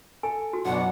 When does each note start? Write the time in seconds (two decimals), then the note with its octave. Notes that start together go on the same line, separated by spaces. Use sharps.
0.23 A4 G#5
0.53 F#4
0.65 F#2 B2 F#3 D4 F#5